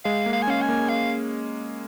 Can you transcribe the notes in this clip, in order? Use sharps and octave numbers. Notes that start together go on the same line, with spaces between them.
G#3 F5
A#3
F5
G#5
C#4 F5
G#5
A#3
F5